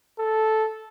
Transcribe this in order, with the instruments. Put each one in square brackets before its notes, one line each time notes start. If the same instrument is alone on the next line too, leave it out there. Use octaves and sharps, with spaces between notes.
[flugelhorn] A4